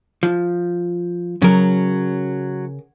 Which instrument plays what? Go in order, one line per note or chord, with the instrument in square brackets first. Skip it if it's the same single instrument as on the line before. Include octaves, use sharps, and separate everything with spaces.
[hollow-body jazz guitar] F3
[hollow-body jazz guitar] C#3 A#4 [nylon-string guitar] F#3